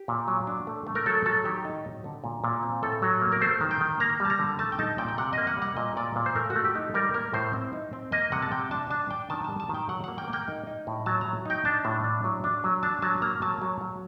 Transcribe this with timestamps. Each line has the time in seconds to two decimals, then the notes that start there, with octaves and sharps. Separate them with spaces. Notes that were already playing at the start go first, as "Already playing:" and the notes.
Already playing: G4
0.08 A#2
0.28 F#3
0.47 D4
0.67 A3
0.87 A3
0.95 A#4
1.06 F#3 A4
1.26 F#3 A4
1.45 D#3 G4
1.65 D#4
1.85 F#3
2.04 D3
2.24 A#2
2.44 A#2
2.63 C4
2.83 A2 A4
3.02 F#3
3.22 A#3
3.32 A#4
3.41 A3 C5
3.61 D#3
3.71 G5
3.81 D#3
4.00 A#3 A#5
4.20 G3 A5
4.30 A#5
4.39 D3
4.59 A3 A5
4.72 G5
4.79 D#4 A5
4.98 A#2 G5
5.08 G5
5.18 C3 F#5
5.33 A#3 D#5
5.47 F#5
5.57 G3 F#5
5.77 A#2 D#5
5.97 A#2 D5
6.16 A#2
6.26 C5
6.36 A3 A#4
6.50 F#4
6.56 A3
6.65 G4
6.75 D#4
6.94 G3 A#4
7.14 A#3 A#4
7.33 A2 C5
7.53 C4
7.73 D#4
7.93 C4
8.12 A#3 D#5
8.32 C3 F#5
8.42 A5
8.51 C3 G5
8.71 D4 A5
8.90 D4 A5
9.11 D4 G5
9.30 D#3 A5
9.44 A5
9.50 G3
9.60 A5
9.69 D#3
9.74 G5
9.89 F#3 F#5
10.04 A#3 F#5
10.18 G5
10.28 A#3
10.33 G5
10.48 D#4
10.67 D#4
10.87 A2
11.06 F#3 A5
11.21 F#3 A#5
11.45 D#4 G5
11.65 D4 A5
11.85 A2
12.04 D4
12.24 F#3
12.44 D4
12.64 F#3
12.83 D4 A5
13.02 F#3 A5
13.22 A#3 A#5
13.42 F#3 A5
13.61 F#3
13.81 F#3